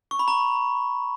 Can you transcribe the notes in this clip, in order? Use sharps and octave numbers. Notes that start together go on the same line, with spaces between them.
C#6
B5
A#5